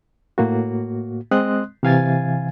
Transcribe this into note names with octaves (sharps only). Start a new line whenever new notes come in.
A2 A#3 F#4
G#3 C4 D#5 C6 D#6 F#6
C3 E3 F5 G#5 G#6 A6